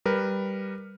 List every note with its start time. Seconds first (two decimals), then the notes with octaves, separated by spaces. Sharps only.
0.05 G3 A#4 B4